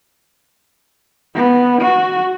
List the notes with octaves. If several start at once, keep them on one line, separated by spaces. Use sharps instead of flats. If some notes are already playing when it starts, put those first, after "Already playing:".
B3
F#4